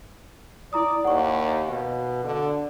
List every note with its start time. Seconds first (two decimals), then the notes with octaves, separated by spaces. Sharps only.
0.73 E4 D5 A#5 D#6
1.04 D#2 F#5 C#6
1.68 B2 F5
2.24 D3